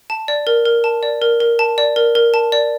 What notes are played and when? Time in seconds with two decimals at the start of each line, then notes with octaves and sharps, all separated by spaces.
0.10 A5
0.28 D5
0.47 A#4
0.65 A#4
0.84 A5
1.03 D5
1.22 A#4
1.40 A#4
1.59 A5
1.78 D5
1.96 A#4
2.15 A#4
2.34 A5
2.52 D5